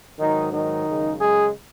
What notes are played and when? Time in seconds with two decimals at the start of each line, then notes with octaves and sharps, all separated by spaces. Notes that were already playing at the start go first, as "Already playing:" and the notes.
0.19 G#2 D#3 F#3 D#4
0.52 D#3 D#4
0.86 F#2 C#3 G#3
1.20 G#3 G#4